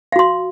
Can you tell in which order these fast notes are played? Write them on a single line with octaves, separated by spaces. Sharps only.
F5 F#4 C6